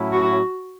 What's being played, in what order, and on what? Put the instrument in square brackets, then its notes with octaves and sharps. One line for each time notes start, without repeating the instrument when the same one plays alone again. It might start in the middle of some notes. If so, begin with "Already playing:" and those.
Already playing: [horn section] A2 F#3 C#4 E4
[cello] F#4